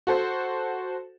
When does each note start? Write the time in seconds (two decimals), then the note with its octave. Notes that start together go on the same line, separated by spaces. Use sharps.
0.07 F#4 A4 C5